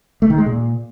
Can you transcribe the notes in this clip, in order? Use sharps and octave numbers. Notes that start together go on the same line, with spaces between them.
A3
D#3
G#3
A#2